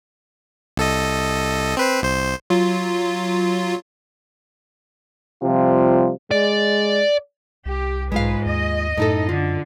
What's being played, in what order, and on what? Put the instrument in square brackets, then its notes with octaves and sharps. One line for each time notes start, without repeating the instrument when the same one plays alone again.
[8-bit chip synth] C2 A4 D#5
C4 B4 C5
C2 C5
F#3 F4
[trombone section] C3 F3 G3 F4
[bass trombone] G#3 [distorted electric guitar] D5
[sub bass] C2 [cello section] G4
[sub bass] B1 [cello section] G#2 B4 [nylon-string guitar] G#3 F4 F5
[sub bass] D#2 [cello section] D#5
[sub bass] F#2 [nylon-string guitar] A2 D#4 A4
[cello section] D3 [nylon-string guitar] F4